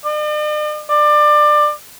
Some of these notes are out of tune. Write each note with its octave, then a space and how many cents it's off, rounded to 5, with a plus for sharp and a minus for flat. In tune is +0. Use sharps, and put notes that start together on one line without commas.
D5 +45
D5 +25